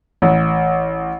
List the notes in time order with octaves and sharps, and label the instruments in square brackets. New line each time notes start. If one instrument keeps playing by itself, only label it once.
[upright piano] A1